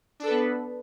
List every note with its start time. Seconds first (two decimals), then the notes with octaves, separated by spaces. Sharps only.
0.20 D4
0.23 A4
0.27 B4
0.30 B3